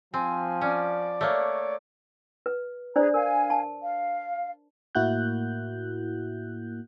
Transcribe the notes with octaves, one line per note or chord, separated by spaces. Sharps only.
F3 C4 G#5
C#4 D5
A3 A#3 C#5
B4
D4 G#4 B4 C5 D5 A#5
A#4 F5 G#5
A5
F5
A2 A#3 E4 F#4 F#6 G6